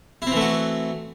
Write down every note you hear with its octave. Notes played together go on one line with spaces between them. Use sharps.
E3 A3 C4 E4 F#4